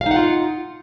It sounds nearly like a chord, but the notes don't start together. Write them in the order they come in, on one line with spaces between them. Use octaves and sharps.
F5 D#4 F#5 F4